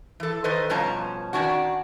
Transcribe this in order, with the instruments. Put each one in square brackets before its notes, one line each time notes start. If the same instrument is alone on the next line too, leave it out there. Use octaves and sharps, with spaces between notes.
[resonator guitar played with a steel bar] E3 A4
D#3 A4 B4 C5 D#5
G2 B2 F3 C#4 A5 A#5
D#3 G3 C#4 D4 F#4 F#5